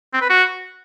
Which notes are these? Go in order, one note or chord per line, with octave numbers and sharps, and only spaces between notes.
C4
B4
F#4